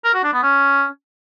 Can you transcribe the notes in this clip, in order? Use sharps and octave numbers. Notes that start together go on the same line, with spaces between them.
A#4
F#4
D4
B3
C#4